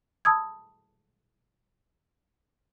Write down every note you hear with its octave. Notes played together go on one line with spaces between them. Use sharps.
A5 B5 D#6 E6 G#6